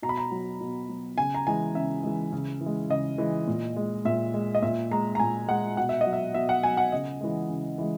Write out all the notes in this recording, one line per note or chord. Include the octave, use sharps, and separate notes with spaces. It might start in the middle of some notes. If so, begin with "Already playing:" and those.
B2 A#5
B5
A#5
F#3
B2
F#3
C#3 G#5
A#5
E3 G#3 G#5
C#3 E5
E3 G#3
C#3
E3
G#3
C#3 D#5
E3 G#3
A#2
G#3
A#2 E5
G#3
D#5
A#2 E5
G#3 A#5
A#5
A#2 G#5
G#3 F#5
B2 F#5
E5
D#5
F#3
E5
B2 E5
F#5
F#3 G#5
F#5
C#3 D#5
E3 G#3
C#3
E3 G#3